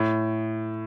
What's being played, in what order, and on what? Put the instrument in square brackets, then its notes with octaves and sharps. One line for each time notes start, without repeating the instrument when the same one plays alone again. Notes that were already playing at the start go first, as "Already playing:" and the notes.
Already playing: [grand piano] A2